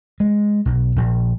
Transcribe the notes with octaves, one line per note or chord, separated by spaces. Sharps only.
G#3
B1
A#1